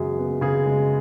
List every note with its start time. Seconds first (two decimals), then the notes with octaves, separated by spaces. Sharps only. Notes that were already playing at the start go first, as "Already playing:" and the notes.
Already playing: F#2 C#3 G#3 B3 G#4
0.18 B3
0.41 C#3 G#4
0.66 G#3